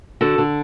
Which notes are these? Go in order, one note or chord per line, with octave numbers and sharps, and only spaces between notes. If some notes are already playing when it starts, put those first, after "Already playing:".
D3 F#4 A4
D3